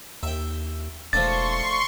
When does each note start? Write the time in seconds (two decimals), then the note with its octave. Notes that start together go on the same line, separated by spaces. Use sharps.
0.23 D#2 E5 G5
1.13 E1 F3 A3 D4 C6 C#6 A6